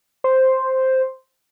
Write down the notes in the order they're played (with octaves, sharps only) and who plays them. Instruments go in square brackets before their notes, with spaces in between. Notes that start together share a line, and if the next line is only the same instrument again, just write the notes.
[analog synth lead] C5